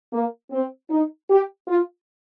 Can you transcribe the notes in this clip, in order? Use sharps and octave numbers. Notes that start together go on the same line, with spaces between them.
A#3
C4
D#4
G4
F4